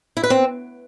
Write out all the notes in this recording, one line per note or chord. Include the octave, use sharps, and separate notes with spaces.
E4
B4
C4